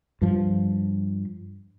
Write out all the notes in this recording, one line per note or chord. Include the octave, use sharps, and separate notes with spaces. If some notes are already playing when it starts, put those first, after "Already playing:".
G2 F3